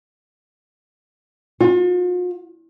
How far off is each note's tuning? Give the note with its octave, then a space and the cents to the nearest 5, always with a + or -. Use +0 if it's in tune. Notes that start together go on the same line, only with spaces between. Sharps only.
F4 +45